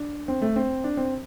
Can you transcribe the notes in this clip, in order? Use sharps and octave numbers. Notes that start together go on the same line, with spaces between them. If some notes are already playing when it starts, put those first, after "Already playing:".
Already playing: D4
C4
A3
C4
D4
C4